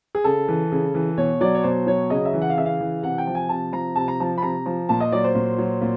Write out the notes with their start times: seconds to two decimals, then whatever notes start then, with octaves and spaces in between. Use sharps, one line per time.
0.15 G#4
0.24 C#3 A4
0.48 E3
0.72 C#3
0.94 E3
1.17 B2 C#5
1.41 F#3 D5
1.55 C#5
1.64 B2 C5
1.87 F#3 C#5
2.10 C#3 D#5
2.25 E5
2.33 E3
2.42 F#5
2.50 F5
2.57 C#3 E5
2.66 F5
2.80 E3
3.03 C3 F#5
3.18 G5
3.27 F3
3.35 G#5
3.49 C3 A5
3.72 F3 A#5
3.96 C3 A5
4.08 A#5
4.20 F3 A5
4.38 B5
4.42 C3 A#5
4.66 F3
4.89 A#2 A5
5.00 D#5
5.12 F#3 D5
5.24 C5
5.35 A#2
5.58 F#3
5.82 A#2